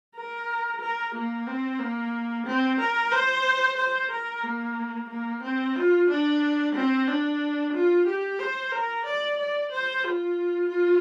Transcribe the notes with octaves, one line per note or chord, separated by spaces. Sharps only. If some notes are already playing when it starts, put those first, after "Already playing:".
A#4
A#4
A#3
C4
A#3
C4
A#4
C5
C5
A#4
A#3
A#3
C4
F4
D4
C4
D4
F4
G4
C5
A#4
D5
D5
C5
F4
F4